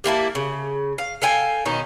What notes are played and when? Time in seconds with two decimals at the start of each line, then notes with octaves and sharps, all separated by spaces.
0.04 G3 A#3 E4 A5
0.35 C#3
0.98 F5
1.22 A4 F5 G5 G#5
1.65 B2 D#3 C#4 D#4